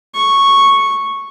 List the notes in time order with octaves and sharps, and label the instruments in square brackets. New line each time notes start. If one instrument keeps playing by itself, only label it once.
[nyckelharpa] C#6